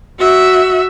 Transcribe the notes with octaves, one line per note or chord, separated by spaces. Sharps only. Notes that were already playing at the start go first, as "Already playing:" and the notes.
F#4 E5